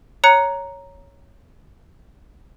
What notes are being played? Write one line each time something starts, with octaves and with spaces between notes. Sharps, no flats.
C#5 A#5 F#6 C#7